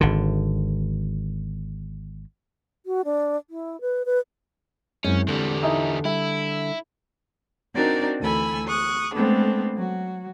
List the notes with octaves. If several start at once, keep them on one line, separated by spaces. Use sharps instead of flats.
G#1 D3
F#4
D4
E4
B4
B4
F#2 G#3 C4 C#4 E4
E2 D3 G3
D#4 E4 E5 G#5 D#6
G3 E4 E5
C4 D4 D#4 F#4 A#4 D5
D2 E3 A4 G#5 B5 E6
C#6 D#6 F#6
G#3 A3 B3 C4 D4 A4
F#3 F#4